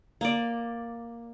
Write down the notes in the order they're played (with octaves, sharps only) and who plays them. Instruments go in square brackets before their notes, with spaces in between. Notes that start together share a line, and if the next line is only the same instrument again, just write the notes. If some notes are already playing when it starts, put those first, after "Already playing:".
[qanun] A#3 D5